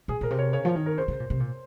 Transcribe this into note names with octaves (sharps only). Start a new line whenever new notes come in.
A#2 G#4
A#2 A#4
C3
C#5
C#3 C#5
F3
D#3
A#4
C#3 C5
C#3
A#2
C3
A#2